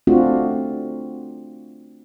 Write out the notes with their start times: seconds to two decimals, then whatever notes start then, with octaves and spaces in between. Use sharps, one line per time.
0.07 A3 C4 D4 F4 F#4